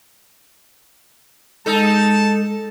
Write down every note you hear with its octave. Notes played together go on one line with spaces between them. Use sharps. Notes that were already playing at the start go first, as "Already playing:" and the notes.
G#3 D#4 A4 A5